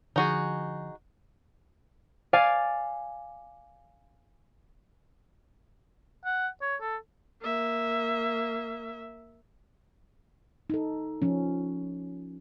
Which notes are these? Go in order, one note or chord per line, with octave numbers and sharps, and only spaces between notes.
D3 F3 D#4 F#4 G#4
D5 F5 G#5
F#5
C#5
A4
A#3 E5
D#4 A4
F3 C#4